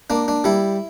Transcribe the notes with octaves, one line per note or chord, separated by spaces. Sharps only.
A#3 D4
D4
G3 E4